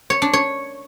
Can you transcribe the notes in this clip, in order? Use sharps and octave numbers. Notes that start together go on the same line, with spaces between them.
C#5
D4
C#5